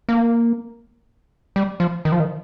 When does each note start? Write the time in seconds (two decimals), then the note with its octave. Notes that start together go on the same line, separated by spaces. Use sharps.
0.09 A#3
1.56 G3
1.80 F3
2.05 D#3
2.12 F3
2.20 D#3